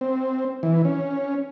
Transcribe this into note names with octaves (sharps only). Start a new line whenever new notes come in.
C4
E3
C#4